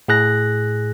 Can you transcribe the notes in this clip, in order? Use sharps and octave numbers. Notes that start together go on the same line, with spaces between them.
A2 G#4 F#6 A#6